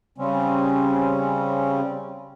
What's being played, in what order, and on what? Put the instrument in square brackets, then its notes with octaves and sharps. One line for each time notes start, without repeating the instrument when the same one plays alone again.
[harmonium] C#3 G3 C4 C#4